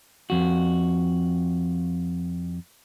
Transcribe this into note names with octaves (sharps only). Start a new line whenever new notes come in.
F2 F#4